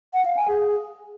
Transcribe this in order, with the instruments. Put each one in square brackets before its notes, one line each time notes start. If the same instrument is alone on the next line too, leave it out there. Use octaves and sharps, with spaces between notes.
[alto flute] F#5
F5
G#5
G#4